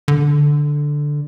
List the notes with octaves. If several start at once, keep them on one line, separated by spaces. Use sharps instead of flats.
D3